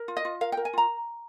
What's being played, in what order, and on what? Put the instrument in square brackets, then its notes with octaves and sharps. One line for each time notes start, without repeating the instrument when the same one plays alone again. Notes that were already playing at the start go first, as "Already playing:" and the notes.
Already playing: [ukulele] A#4
F4
D#5
F4
A#4 F5
G5
A#4
G#5
F4 A#5